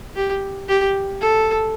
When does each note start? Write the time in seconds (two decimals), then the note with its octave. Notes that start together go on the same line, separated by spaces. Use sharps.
0.15 G4
0.68 G4
1.21 A4